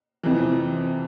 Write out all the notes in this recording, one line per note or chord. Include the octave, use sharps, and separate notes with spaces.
F2 C3 E3